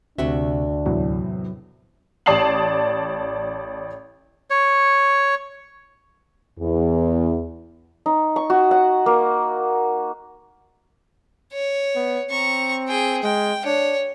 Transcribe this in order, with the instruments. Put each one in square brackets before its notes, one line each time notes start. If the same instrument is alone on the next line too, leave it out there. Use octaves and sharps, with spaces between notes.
[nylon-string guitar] D2 F#4 E5 [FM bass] C3 [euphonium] D4
[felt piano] E2 A2 C3 [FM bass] F#3
[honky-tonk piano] A1 D5 A5 D#6 C7 F#7
[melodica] C#5
[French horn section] E2
[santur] D#4
C#6
F#4
F#5
A#3
[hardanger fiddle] C#5
[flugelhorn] B3
[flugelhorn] C4 [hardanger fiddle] A#5 C#6
[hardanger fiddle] G#4 G5
[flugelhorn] G#3 [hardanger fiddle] G5
[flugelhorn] D4 [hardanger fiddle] C#5